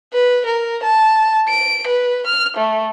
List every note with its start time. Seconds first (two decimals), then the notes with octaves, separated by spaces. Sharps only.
0.13 B4
0.45 A#4
0.83 A5
1.48 D7
1.87 B4
2.26 F6
2.57 A3